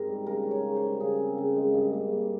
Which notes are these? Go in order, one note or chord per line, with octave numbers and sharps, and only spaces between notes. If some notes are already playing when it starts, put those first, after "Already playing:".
Already playing: G#2 C4 A#4
G3
C#3 A#4
C#4
C#5
C#3
C5
G3
C#3 G#4
C4
C#3
G#3
G2
A#3
G2